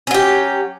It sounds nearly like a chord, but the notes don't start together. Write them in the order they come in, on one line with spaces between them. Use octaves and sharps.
C#4 F#3 G4